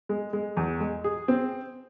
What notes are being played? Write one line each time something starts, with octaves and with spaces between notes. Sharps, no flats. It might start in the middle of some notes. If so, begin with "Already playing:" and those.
G#3
G#3
E2
G#3
G#4
C4